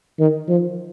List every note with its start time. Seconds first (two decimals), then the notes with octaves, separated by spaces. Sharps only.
0.20 D#3
0.49 F3